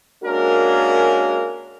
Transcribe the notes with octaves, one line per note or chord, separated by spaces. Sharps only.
G#3 A#3 C#4 D4 F#4 A#4